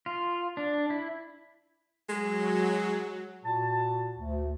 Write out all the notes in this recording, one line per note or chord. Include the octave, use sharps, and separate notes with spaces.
F4
D4
E4
F#3 G#3
A#2 F#4 A5
D2